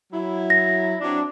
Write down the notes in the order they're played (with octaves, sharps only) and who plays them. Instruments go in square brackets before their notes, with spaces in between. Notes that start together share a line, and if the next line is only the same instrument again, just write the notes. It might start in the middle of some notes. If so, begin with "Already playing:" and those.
[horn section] F#3 E4
[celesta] A#6
[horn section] F#3 C4 D4